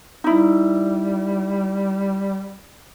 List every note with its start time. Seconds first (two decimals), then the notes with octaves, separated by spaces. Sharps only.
0.24 G3 D#4 E4